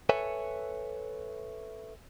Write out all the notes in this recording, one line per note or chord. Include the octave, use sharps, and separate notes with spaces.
A4 B4 C#5 E5 G#5